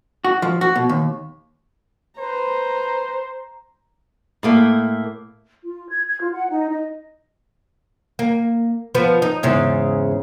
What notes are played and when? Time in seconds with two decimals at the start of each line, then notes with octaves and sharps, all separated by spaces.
0.24 F#4
0.42 F3
0.61 F#4
0.76 B2
0.89 D#2
2.19 B4 C5 A#5
4.43 A2 A3 A#3
5.64 F4
5.89 G#6
6.08 G#6
6.21 F4
6.34 F#5
6.50 D#4
6.70 D#5
8.19 A#3
8.95 F3 B3
9.22 D#4
9.43 E2 G#2 C#3